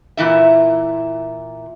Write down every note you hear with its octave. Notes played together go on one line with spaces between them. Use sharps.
A#2 E3 E4 E5